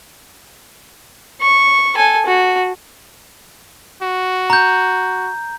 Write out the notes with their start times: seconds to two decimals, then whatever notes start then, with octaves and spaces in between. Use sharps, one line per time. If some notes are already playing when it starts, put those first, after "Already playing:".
1.41 C#6
1.95 A4 G#5
2.26 F#4
4.03 F#4
4.50 A#5 G6